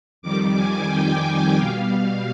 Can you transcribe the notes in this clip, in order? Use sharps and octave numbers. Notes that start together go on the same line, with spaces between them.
F2 D#3 G3 D6
G#5
G5
B2 G3 F5
F5